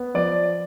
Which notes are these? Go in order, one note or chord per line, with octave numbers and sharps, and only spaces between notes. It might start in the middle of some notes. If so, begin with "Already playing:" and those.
Already playing: B3
F3 D5